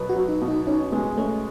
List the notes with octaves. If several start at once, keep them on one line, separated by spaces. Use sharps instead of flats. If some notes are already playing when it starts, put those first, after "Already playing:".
Already playing: B2 F#3 B3
F#4
F#3
D#4
B2
D#4
C#4 D#4
G#3 B3
A3 C#4